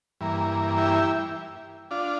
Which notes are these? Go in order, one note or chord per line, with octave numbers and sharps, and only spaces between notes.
G2 E3 A#3
E4 G4
D4 F4